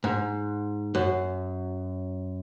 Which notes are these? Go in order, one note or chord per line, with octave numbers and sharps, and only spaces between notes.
G#2
F#2